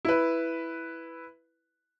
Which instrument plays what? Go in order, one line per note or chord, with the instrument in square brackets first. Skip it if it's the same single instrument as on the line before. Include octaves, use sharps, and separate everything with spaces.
[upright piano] E4 B4